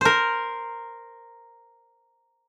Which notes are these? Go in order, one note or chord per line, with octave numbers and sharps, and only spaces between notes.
A#4 C5